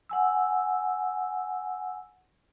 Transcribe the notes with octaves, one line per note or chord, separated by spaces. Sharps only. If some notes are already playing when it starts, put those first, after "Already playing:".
F#5 G#5 E6